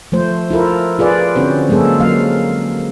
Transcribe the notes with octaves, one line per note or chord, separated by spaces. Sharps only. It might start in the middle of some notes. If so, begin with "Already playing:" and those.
F3 A3 C5
E4 F4 A4 A#4
F4 G#4 B4 D5
D3 C4 C#4 F#4 C5
F#3 G#3 A#3 G#4 A4
F#3 A#3 F5